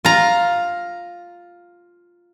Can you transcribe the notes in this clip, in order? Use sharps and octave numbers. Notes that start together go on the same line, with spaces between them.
F4 A#5